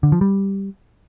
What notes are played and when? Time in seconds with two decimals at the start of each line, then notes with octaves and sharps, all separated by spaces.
0.03 D3
0.12 F3
0.21 G3